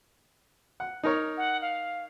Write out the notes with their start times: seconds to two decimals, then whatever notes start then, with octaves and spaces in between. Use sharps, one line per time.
0.80 F#5
1.03 D#4 A#4 C#5
1.37 F#5
1.62 F5